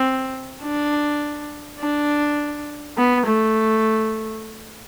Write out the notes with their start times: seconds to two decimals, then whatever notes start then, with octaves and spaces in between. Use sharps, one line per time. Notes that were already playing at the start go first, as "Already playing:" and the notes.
Already playing: C4
0.62 D4
1.80 D4
2.97 B3
3.26 A3